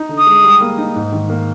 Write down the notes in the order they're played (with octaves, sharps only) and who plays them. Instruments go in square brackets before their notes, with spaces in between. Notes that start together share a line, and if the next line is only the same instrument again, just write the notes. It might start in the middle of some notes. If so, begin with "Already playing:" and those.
Already playing: [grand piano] D#4
D3
[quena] D#6
[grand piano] G#3
G3
A#3
D#4
G#2
D#3
A#3